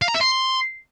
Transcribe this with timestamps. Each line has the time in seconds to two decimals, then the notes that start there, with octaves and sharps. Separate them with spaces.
0.02 F5
0.08 A#5
0.14 E5
0.21 C6